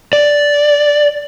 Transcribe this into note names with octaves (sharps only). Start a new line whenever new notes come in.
D5